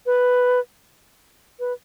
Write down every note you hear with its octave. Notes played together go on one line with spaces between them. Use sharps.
B4
B4